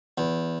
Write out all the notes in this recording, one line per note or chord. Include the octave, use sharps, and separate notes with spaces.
E2